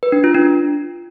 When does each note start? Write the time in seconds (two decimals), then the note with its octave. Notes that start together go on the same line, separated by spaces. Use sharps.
0.03 B4
0.12 D4
0.24 F4
0.34 D4